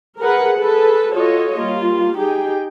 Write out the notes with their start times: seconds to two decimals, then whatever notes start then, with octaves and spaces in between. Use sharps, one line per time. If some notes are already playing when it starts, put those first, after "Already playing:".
0.19 G#4 A#4 B4 F#5
0.60 G#4 A4 B4
1.14 F4 F#4 A4 C#5 D#5
1.57 G3 A#3 F4
2.17 D#4 G4 G#4 G5